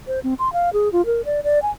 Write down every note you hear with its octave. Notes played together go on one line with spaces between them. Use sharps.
C5
C4
C6
F5
G#4
F4
A#4
D5
D5
G#5